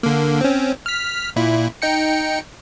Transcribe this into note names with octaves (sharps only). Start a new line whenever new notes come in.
D3 A#3
C4 C#4
F6 B6
A#2 E4
D#4 G5 C#7